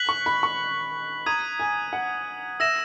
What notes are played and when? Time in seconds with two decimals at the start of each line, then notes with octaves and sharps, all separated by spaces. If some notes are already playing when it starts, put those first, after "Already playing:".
Already playing: F#6 B6 F#7
0.09 C#6
0.26 B5
0.43 C#6
1.26 A#5 D#6 G#6 D#7
1.59 G#5
1.93 F#5
2.60 E5 E6 A#6 E7